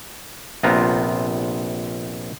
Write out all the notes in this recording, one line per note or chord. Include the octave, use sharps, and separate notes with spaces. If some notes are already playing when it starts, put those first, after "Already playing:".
A#1 C3 B3 F4 A#5